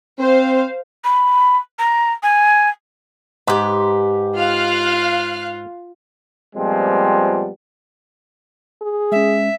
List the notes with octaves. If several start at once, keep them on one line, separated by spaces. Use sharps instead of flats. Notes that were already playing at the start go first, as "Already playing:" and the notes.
C4 C5 F5
B5
A#5
G#5
G#2 G4 B4
F4 F5 F6 F#6
A#2 F3 G3 G#3 B3 C4
G#4
G#3 C#4 E5